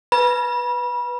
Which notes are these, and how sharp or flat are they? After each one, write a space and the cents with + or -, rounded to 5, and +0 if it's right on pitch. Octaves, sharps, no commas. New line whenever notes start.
B4 +0 B5 -30